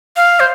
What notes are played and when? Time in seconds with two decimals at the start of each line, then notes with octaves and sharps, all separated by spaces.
0.16 F5
0.40 C5